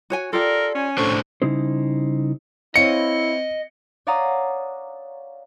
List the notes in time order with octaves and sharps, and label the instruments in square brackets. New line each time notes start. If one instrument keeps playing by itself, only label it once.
[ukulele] F#4 C#5 G#5
[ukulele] F4 G4 D5 [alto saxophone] A4 [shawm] A#4
[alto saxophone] C#4 [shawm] G#5
[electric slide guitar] A2 D4 C5 [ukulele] A4 [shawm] C#6
[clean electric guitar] C#3 G3 D#4 E4 C5
[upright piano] C4 C#5 F5 [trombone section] E4 [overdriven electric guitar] D#5 [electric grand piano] C#7
[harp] C#5 D5 F5 F#5 A#5 D#6